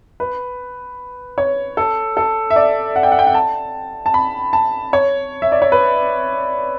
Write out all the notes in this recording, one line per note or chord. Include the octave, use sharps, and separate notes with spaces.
B4
C#5
A4
A4
E5
D5
F#5
G5
F#5
G5
F#5
A5
A5
B5
A5
C#5
E5
D5
C#5
B4